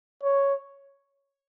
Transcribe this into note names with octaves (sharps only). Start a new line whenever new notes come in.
C#5